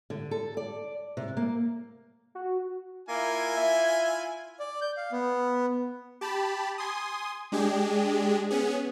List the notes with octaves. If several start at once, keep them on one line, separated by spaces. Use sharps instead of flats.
D3
A4
D5
C3
A#3
F#4
A#3 E4 F4 G#5
E5
D5
G6
F5
B3
G4 A5 B5
G#5 C6 D#6
G#3 D4 G4 G#4
B3 C#4 G#4